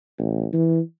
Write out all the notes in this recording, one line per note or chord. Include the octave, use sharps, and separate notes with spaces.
A1
E3